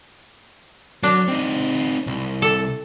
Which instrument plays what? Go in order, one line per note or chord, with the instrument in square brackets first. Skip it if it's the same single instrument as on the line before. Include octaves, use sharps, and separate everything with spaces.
[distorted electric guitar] F#3 [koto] D4
[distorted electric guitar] C4 D#4
C2
[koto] A4